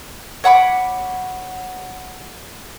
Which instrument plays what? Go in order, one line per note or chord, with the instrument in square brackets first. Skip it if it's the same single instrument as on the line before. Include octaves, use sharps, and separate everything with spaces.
[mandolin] C#5 F#5 B5 D6